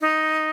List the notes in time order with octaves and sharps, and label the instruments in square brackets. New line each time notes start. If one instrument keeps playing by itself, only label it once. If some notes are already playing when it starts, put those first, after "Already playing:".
[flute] D#4